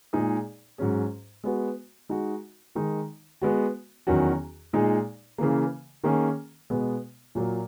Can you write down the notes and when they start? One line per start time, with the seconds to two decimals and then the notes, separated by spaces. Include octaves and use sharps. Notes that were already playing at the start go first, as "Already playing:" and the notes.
0.13 A#2 G#3 D#4 G#4
0.78 G#2 F#3 C#4 G#4
1.44 G#3 B3 F#4
2.09 G#3 D#4 F#4
2.75 D#3 G#3 D#4
3.42 G#3 B3 F#4
4.07 E2 D#3 F#3 C#4 F#4
4.73 A#2 G#3 D#4 G#4
5.38 C#3 E3 A#3
6.04 D#3 A#3 C#4 G#4
6.70 B2 G#3 B3
7.35 A#2 F#3 A#3